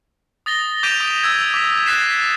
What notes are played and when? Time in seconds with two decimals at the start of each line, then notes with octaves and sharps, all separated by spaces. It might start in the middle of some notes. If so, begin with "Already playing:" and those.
0.46 D#6 A6 A#6 G7
0.83 D6 G6 B6 D7 D#7 F7
0.99 D#6 D7
1.23 E6 G#6
1.54 D6 B6
1.86 F#6 A6 B6 C7 E7